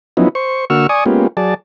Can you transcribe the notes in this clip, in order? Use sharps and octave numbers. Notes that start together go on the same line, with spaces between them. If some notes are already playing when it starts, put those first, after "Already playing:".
F3 F#3 B3 C#4 D#4 E4
C5 C#6
D3 A#3 F#4 C#6 E6 F6
D5 G#5 C#6 D#6
G#3 A#3 B3 C#4 F4 G4
F#3 G#4 D5 A5